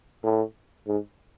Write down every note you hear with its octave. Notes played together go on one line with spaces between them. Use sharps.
A2
G#2